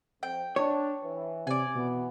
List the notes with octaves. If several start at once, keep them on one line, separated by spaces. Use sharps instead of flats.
F2 G5
D4 C#5
E3
C3 D5 G#5
B2 E3 B3